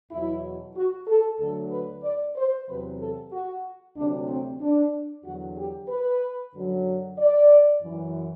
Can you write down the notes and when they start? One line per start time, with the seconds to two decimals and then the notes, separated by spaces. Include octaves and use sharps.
0.10 E2 B2 F#3 E4
0.76 F#4
1.08 A4
1.39 D2 D3 F#3 A4
1.71 B4
2.03 D5
2.36 C5
2.68 E2 C3 F#3 B4
3.00 A4
3.32 F#4
3.96 D2 C3 F#3 D4
4.28 C4
4.60 D4
5.24 E2 D3 F#3 F#4
5.57 G4
5.89 B4
6.54 F#2 D3 F#3
7.18 D5
7.81 F#2 E3